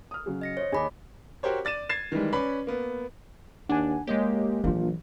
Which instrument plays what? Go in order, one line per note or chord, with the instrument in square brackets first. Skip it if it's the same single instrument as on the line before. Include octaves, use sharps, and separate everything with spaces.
[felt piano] D#6 F6
C#3 F#3 G#4
[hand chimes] D#5 A#6 C#7
[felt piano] C5 D#5 [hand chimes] C#5
[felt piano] D#2 G#4 G#5 [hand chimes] D#5 B5 D6
[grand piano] F#4 G4 A#4 C5 C#5
D5 A6 D#7 E7
G#6 A6 C7 E7
D#3 E3 G3 G#3
C#4 B4 D5 B5
A#3 B3
[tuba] D#2 [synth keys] D4 [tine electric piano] F#5 G#5
[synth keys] G#3 G4 [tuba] A#3 [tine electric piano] C#5 D#5
[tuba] A#1 [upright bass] E3 F#3 [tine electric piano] A#3 D4 F4